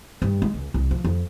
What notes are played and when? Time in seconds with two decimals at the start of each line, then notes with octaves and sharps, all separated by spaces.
0.22 G2
0.42 G#3
0.54 C#2
0.74 C2
0.91 F3
1.04 F2